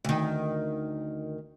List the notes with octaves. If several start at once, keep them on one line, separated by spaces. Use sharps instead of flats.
D2 D#3